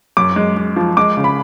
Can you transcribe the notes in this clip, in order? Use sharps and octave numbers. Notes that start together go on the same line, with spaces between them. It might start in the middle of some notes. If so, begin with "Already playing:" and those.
F#2 D6
G#3
G#3
F3
G#3 D6
C#3
B5